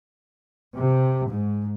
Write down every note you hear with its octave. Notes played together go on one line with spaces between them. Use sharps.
C3
G#2